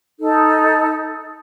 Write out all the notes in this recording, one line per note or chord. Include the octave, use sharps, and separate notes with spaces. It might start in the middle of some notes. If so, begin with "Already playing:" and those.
D#4 A4